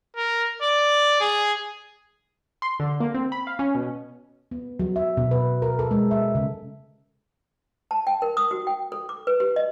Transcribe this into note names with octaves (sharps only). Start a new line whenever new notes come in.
A#4
D5
G#4
C6
D3
A#3
C4
B5
F5
C#4
B2
B3
F#3
E5
B2
B4
A#4
A4
G#3
E5
C#3
A5
G5
A#4
D#6
F#4
G5
A4
D6
B4
G4
D#5